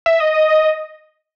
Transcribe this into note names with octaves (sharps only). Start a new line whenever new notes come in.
E5
D#5